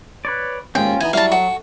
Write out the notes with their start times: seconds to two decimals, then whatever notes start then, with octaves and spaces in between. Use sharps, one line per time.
0.25 B4 C#5 D5
0.75 D#2 G#2 C#4 F4 G5
1.01 E3 B3 D#4 G#5
1.13 F#3 G3 E4 C#5 F5 A5
1.32 F#4 A4 C#5